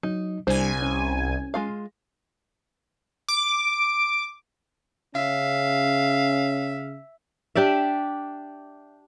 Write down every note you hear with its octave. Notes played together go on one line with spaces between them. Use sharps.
F#3 D#4
C2 G3 D4 C5 G#5
C#4
G#3 F4 F5
D6
C#3 C#4 E5 F5
D4 G4 D5 E5